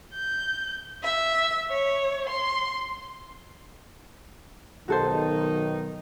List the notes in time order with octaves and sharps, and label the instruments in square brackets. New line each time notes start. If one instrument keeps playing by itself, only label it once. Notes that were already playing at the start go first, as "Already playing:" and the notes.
[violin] G6
E5
C#5
C6
[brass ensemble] B1 D#3 D#4 [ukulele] F#4 A4 C5